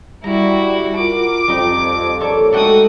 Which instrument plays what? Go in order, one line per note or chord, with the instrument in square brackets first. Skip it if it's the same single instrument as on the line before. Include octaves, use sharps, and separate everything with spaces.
[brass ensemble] G3 [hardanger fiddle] E4 F#4 [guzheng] A#5
[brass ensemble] F4 F#4 A#4 [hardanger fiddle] D6
[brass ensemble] F2 [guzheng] G3 D#4
[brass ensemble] A#1 A#4 D5 [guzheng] A4 C#5
[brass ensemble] G#3 A3 D#4 [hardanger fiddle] F#4 D#6 [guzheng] A4 F#5 G5